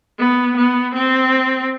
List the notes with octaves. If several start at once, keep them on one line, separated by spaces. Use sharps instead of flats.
B3
B3
C4